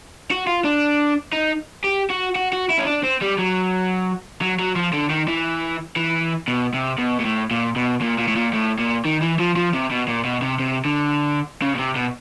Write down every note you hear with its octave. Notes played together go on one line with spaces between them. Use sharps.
F#4
F4
D4
D#4
G4
F#4
F#4
F#4
E4
C#4
D4
C4
G3
F#3
F#3
F#3
F3
D3
D#3
E3
E3
B2
C3
B2
A#2
A2
A#2
B2
A#2
A#2
A2
A#2
A2
A#2
D#3
E3
F3
F3
C3
B2
A#2
B2
C3
C3
D3
C#3
B2
C3
B2